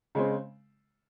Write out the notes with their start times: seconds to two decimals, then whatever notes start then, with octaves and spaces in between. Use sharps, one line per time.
0.15 C#3 G#3 C4